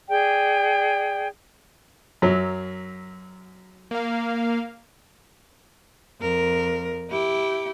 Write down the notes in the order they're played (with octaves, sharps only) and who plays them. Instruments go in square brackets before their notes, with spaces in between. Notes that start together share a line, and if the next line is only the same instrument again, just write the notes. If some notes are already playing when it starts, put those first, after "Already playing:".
[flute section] G#4 D5 G5
[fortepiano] F#2 F#3
[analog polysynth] A#3 F5
[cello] F2 A#4
E4 G4